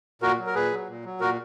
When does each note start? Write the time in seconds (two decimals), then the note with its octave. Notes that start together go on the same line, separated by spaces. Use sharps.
0.22 A#2 F#4 A#4
0.39 F#3
0.47 A#4
0.55 A#2 G#4 B4
0.71 F#3
0.88 A#2
1.05 F#3
1.20 A#2 F#4 A#4